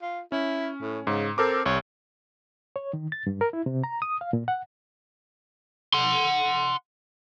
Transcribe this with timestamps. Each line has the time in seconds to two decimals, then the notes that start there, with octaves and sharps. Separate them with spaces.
0.02 F4
0.32 C#4 E4
0.81 A2
1.07 G#2 C#3
1.38 C4 A4 A#4 D6
1.66 C2 C#5
2.76 C#5
2.93 D#3
3.12 A6
3.27 G2
3.41 A#4
3.53 E4
3.66 C3
3.84 A#5
4.02 D#6
4.21 F5
4.33 A#2
4.48 F#5
5.94 F#5 C6